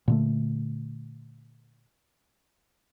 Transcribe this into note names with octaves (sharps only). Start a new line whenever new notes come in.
A#2 D3 A3